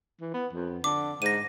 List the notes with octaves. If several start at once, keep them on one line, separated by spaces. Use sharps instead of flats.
E3
B3
F2
D3 D6
G#2 A#6 D#7